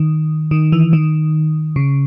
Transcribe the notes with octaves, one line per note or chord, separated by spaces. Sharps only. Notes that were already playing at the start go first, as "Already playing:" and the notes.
Already playing: D#3
D#3
E3
D#3
C#3